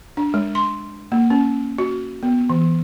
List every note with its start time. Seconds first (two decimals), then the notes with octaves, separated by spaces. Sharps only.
0.17 D4
0.34 G#3
0.55 C6
1.12 A#3
1.30 C#4
1.78 F#4
2.23 B3
2.50 E3